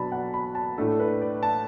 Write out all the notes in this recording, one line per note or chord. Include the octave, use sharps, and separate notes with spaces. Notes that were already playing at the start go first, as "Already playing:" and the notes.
Already playing: B2 F#3 D4 A5 B5
F#5
B5
A5
A2 A3 D4 A4
B4
D5
A5